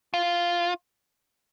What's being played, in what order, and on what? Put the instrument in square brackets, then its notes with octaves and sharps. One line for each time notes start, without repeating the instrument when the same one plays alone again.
[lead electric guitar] F4